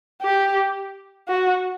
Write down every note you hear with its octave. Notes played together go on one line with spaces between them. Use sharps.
G4
F#4